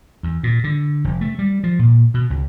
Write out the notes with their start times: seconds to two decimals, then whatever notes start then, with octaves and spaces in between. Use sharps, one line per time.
0.23 E2
0.43 A#2
0.64 D3
1.04 F1
1.21 A3
1.39 G3
1.64 F3
1.79 A#2
2.14 B2
2.30 C#2